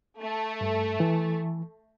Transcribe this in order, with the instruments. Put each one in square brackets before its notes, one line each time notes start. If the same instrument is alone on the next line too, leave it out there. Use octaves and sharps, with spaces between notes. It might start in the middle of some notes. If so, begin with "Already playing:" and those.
[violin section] A3
[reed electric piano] G2
E3